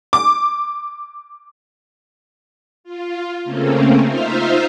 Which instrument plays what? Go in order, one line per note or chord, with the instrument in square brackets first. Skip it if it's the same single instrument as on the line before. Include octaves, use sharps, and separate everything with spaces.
[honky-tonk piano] D6
[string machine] F4
C#3 A3 A#3 C4 C#4
D#4 F4 C5 E5 F5